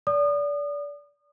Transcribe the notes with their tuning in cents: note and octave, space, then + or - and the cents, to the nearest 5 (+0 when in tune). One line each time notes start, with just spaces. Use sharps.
D5 -25 D#6 -35